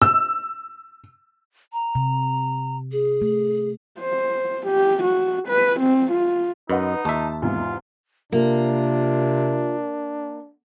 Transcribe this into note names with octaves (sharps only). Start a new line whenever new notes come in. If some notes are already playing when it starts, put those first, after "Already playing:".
E6
A#5
C3
G#4
A3
C5
G4
F#4
B4
C4
F4
F#2 D#4 B4 D#5 F#5
D#2 E5 A5
E2 G#2 C3 F4
C3 A#3 D4 F4